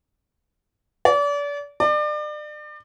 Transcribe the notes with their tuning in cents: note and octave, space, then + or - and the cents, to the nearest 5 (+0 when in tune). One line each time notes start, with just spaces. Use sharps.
D5 -35
D5 +35